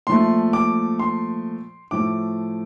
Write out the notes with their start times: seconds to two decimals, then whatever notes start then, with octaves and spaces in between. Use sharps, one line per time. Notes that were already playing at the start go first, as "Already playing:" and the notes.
0.07 A#2 F3 A3 C6
0.53 D6
0.99 C6
1.91 A2 F3 A3 D6